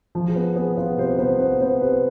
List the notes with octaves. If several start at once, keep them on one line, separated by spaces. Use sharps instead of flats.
F3
G#4
B3 B4
B3 G#4
B3 F4
C3 C5
B3 C5
B3 B4
B3 C5
C3 B4